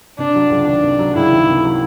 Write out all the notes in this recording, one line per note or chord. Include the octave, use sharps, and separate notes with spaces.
C3 D4
F#3
C#2
D#3 D4
C3
F#3
C#2 E4
D#3
C3
F#3